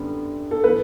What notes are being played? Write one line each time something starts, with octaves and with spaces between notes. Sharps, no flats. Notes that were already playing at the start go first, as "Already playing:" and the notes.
Already playing: F#2 D3 G3 B3 D4
A4
E3 B3 B4